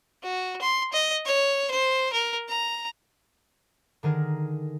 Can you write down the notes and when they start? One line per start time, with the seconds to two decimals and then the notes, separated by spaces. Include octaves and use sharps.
0.23 F#4
0.62 C6
0.93 D#5
1.26 C#5
1.71 C5
2.13 A#4
2.49 A#5
4.03 D3 D#3 G#4 A#4